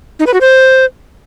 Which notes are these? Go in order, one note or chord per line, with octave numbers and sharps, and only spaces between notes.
D#4
B4
F#4
C5